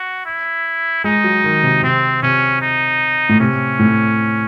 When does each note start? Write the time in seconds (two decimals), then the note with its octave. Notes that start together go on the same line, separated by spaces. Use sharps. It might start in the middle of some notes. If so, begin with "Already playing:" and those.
Already playing: F#4
0.26 E4
1.04 G#3 D#4
1.24 F#3
1.44 D#3
1.63 C3
1.83 C3 C4
2.22 C3 C#4
2.61 D#4
3.29 A2
3.40 C3 C#4
3.79 A2